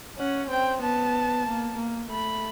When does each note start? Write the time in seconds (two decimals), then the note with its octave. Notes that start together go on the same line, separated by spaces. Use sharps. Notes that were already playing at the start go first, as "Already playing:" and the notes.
0.18 C#4 F#5
0.49 C4 G5
0.82 B3 A5
1.47 A#3
1.78 A#3
2.10 A3 B5